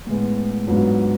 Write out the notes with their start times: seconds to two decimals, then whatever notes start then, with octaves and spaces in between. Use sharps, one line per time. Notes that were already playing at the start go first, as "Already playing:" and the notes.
0.07 A2 G#3 B3
0.67 G#2 F#3 B3 D4 F4